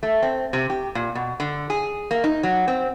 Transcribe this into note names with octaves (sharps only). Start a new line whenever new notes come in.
A3
C4
C3
G4
A#2
B2
D3
G#4
A#3
D#4
F#3
C4